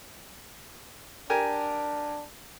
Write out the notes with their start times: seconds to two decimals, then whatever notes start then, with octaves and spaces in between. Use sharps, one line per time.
1.30 D4 G4 A#4 G#5